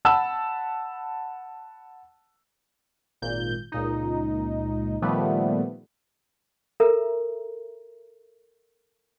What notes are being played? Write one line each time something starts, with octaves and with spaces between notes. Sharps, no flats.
F#5 A5 B5 E6
G#1 A#2 G6
C#2 A#2 D#4
A#2 D#3 F3 G3 A3 B3
A4 A#4 E5 A#5